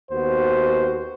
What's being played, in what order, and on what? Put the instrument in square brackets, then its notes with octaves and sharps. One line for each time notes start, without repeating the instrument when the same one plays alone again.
[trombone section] D#2 B3 F#4 C5